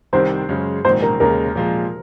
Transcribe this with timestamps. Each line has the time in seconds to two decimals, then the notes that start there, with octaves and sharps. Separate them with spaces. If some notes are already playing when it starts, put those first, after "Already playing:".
0.13 C2 C3 D#3 C5
0.49 F#2 C#3 G#3
0.84 A#1 G#2 D#3 C5
1.02 A#4
1.20 D#2 C#3 G#3 A#4
1.55 A#2 F3 G#3